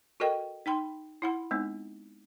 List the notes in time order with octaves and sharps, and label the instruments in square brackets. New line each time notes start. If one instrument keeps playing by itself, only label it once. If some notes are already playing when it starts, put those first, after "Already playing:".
[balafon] F#4 A4 A#4 D#5 G5
D#4 G5 B5 C6
E4 F#5 B5
G#3 B3 C4 D#4